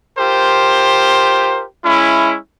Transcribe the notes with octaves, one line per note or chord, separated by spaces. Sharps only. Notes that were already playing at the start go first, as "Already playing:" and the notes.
F4 G4 A#4 C5
G#3 C#4 E4